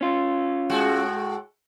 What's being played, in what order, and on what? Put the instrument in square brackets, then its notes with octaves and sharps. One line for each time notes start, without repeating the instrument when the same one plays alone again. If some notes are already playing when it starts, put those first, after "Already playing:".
[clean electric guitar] C#4 F4
[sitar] A2 G#3 F#4